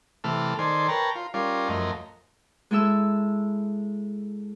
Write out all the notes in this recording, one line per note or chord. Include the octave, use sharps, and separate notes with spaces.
C3 E3 A3 A4 F6
D#3 A4 C5 D5 G#5 C6
A#4 B4 C#5 G5 A5 A#5
F4
G3 C#4 F4 A#4 D5 F5
F#2 F3 A3 A#4 D#5
G#3 E4 A4 E5 E6